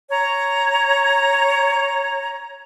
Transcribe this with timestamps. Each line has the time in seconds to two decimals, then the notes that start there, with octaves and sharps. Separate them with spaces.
0.10 C#5 A#5